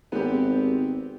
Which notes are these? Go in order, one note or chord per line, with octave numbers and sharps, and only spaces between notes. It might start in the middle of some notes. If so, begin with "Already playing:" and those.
G#1 B3 C4 G4